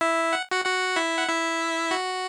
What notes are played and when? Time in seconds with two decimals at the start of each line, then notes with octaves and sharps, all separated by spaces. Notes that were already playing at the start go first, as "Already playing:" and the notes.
0.01 E4 E5
0.33 F#5
0.51 F#4 F#5
0.65 F#4 F#5
0.96 E4 E5
1.18 F#5
1.28 E4 E5
1.91 F#4 F#5